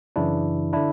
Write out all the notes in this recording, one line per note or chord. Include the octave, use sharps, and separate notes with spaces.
F#2 C#3 E3 D4 E4
D3 D4 E4